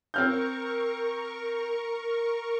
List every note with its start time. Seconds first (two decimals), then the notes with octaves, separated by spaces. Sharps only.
0.14 C4 A#4 C#6 F6 G6